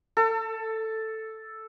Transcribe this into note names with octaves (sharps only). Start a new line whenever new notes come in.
A4